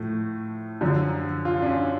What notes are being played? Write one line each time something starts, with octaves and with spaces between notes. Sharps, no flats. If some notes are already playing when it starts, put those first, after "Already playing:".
Already playing: A2 F3 A3
F#2 D3 F3
F4
D4
C#4